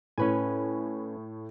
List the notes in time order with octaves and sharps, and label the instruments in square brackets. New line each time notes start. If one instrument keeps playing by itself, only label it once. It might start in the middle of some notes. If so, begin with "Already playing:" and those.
[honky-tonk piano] A2 [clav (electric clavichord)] C#4 B4 G#5